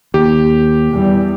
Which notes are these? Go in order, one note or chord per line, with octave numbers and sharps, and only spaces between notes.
D#2 G4
E2 G3